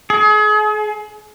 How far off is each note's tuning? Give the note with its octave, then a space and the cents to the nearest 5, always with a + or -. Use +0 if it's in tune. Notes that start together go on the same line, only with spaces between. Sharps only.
G#4 +35